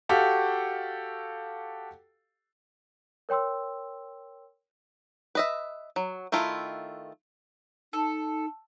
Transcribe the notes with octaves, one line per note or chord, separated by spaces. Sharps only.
F#4 G4 A4 F5
A#4 C#5 G5 C6 E6
B4 D#5 E5
F#3
D#3 A3 E4 F4
D#4 A4